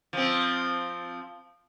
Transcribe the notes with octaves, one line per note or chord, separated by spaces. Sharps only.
F3 C4